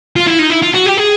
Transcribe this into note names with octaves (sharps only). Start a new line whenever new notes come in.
F4
E4
D#4
E4
F4
F#4
G4
G#4